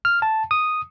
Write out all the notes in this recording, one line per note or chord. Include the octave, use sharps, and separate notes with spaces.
F6
A5
D#6